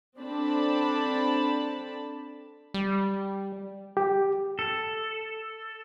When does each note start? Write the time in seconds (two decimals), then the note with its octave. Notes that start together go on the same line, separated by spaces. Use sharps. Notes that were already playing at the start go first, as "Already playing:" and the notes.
0.18 C4 D4 A4 A5 B5
2.74 G3
3.97 G4
4.59 A4